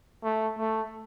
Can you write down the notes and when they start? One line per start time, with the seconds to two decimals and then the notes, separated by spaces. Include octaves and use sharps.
0.24 A3
0.58 A3